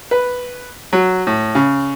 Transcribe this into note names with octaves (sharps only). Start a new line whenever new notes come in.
B4
F#3
A2
C#3